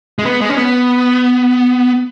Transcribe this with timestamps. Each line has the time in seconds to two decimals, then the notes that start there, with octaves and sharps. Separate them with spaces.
0.19 G#3
0.25 B3
0.41 G#3
0.49 C#4
0.57 B3